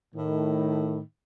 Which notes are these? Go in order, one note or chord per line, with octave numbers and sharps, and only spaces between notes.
A2 D#3